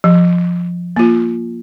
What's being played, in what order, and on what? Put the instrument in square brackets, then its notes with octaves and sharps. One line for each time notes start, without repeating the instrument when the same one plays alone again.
[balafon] F3
A#3 F4